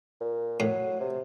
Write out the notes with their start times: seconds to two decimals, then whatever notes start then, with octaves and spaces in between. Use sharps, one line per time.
0.21 A#2
0.60 A2 F#3
1.00 C3